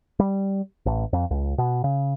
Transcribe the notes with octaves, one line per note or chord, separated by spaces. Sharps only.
G3
A1
F2
C#2
B2
C#3